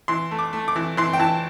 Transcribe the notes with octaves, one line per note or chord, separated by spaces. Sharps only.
E3 C6
A3
D6
A3
D6
E3
E3 C6
G5
E3 A5